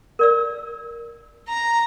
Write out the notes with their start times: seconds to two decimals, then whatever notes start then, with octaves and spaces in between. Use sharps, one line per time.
0.19 A#4 D5 E6
1.48 A#5